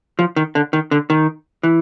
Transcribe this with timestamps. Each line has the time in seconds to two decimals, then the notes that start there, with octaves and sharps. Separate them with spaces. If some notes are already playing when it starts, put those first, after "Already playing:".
0.19 F3
0.36 D#3
0.55 D3
0.73 D#3
0.91 D3
1.10 D#3
1.63 E3